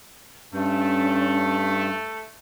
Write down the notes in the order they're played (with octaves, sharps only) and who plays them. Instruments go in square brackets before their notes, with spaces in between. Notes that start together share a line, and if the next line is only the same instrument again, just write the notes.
[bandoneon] G2 [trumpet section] A3 [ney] C#4